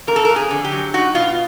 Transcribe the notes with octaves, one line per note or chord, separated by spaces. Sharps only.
F2 A#4
A4
A#4
F2
G#4
D3
G4
F#3
D#4 F#4
B2 F4